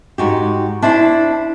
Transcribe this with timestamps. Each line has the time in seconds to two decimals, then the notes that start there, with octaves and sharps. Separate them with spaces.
0.18 G#2 F#4 G4
0.82 D4 E4 C5 A5